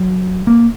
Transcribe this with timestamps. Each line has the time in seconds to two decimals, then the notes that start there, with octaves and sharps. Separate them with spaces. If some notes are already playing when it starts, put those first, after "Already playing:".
Already playing: F#3
0.47 A#3